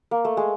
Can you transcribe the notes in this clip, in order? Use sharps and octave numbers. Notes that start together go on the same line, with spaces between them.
A#3
A3
G#3